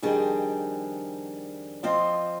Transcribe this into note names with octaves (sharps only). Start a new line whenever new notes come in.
F2 D#3 G3 D4 G#4
F3 C4 F4 C5 D#5